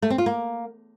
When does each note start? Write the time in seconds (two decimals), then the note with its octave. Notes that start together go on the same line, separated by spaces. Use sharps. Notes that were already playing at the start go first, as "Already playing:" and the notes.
0.02 A3
0.10 C4
0.18 F4
0.26 A#3